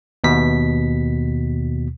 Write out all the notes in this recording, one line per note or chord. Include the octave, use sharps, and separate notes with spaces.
D#2 B2 B6